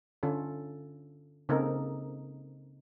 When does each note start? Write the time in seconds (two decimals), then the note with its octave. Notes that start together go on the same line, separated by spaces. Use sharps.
0.23 D3 C#4 F4 A4
1.49 C#3 A#3 C4 D#4 A4 A#4